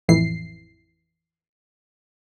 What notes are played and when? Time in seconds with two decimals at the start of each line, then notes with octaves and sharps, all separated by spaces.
0.08 A1 F2 E3 C7